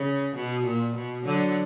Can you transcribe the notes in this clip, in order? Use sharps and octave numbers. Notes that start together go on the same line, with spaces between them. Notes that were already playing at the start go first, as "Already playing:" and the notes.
Already playing: C#3
B2
A#2
B2
D3 F#3